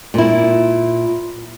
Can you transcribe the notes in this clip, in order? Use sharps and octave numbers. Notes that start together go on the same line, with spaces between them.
A#2 E4